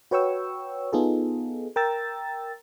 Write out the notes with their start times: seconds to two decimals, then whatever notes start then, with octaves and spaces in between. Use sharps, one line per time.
0.11 F#4 B4 C#5 G5 C#6 E6
0.93 B3 D#4 F4 G#4 A4
1.76 A#4 G5 A#5 E6 A6